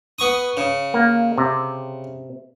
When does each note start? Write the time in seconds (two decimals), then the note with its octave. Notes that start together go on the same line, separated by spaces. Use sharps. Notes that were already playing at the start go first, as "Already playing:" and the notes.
0.19 B3 C#6 D#6
0.57 C#3
0.94 A#3
1.38 C3